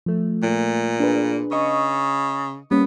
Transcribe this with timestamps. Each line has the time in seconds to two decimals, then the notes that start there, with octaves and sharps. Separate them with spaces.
0.06 F3 A3
0.43 A#2
1.00 D4 G#4 B4
1.51 C#3 D#5 C#6 D#6
2.71 G3 A#3 B3 C#4